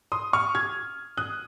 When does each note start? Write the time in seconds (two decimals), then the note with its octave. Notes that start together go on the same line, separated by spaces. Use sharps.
0.12 C6 D#6
0.33 C#6 F6
0.55 F6 G#6
1.17 D#6 F#6